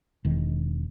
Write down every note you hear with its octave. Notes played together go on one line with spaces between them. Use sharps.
E1 D#3